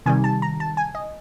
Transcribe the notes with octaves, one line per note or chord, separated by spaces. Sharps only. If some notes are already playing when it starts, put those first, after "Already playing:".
C3 D#3 G3 G#5
A5
A#5
A5
G#5
D#5